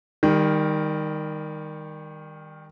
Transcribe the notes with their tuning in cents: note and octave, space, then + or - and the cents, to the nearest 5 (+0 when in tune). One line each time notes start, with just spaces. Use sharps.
D#3 +0 G3 +30